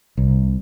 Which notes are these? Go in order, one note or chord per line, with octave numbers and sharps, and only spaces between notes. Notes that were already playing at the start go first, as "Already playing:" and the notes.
C2